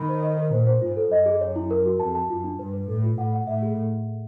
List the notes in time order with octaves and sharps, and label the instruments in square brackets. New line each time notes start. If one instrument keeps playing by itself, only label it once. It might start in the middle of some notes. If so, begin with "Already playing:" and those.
Already playing: [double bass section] D#3 [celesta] B5
[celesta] C5
D#5
A#4
[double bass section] A#2 [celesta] C5
[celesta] C5
[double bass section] G#2 [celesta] F4
[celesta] A4
[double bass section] F#2 [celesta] D#5
[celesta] G#4
C#5
E4
A#4
F#4
[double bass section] F2 [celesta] A5
[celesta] A5
[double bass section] F#2 [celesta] F4
[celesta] D4
[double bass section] G2 [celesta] B4
[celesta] B4
[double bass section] A2 [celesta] A4
[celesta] F4
[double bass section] A2 [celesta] F#5
[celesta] F#5
[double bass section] A2 [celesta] E5
[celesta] G#4